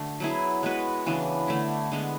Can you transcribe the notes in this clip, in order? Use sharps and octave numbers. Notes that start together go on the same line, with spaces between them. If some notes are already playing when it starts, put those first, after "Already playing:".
Already playing: D3 A3 D4 F#4
F#3 B3 E4 G#4
G#3 B3 F#4 B4
C#3 E3 B3 D4
D3 A3 E4
D3 G#3 B3